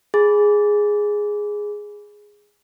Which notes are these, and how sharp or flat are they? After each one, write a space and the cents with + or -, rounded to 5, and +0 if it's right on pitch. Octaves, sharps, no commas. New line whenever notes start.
G#4 +0 B5 +0